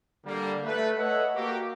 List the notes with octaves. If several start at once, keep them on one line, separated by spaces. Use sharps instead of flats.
D3 G3 A#3
A3 B4
A4 B4 C#5 D#5 E5 F#5
A#3 F#4 G4